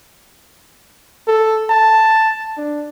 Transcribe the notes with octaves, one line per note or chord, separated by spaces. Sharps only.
A4
A5
D4